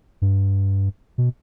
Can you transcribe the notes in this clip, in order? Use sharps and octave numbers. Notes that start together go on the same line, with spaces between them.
G2
B2